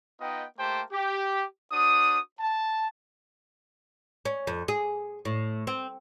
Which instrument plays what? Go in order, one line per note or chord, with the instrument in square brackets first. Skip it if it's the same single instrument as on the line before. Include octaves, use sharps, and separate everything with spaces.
[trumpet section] B3 D#4 F4 D#5 G5
A3 A#3 G4 C5 G5 A5
G4
D4 F#4 C5 D#6
A5
[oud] C#4
F2
G#4
A2
C4